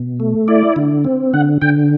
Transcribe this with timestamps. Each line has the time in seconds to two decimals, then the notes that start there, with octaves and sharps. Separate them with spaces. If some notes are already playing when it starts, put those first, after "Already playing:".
Already playing: B2
0.20 A3
0.48 E4 D5
0.76 D3
1.05 C4
1.33 D3 F#5
1.61 D3 G5